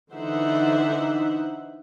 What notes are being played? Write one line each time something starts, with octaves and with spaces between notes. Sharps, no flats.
D3 E3 D#4 C5 E5 F#5